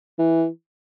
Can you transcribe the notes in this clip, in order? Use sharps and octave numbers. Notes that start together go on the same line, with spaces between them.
E3